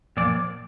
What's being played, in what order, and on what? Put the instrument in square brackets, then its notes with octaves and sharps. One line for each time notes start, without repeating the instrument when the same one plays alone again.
[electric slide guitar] A#2 F3 D5